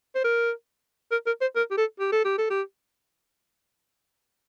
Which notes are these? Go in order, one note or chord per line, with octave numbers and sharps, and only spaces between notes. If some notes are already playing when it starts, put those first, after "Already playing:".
C5
A#4
A#4
A#4
C5
A#4
G4
A4
G4
A4
G4
A4
G4